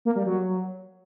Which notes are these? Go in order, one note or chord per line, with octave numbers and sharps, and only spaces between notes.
A#3
G3
F#3